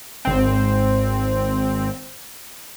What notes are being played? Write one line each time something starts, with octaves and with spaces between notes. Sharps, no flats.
G#1 C4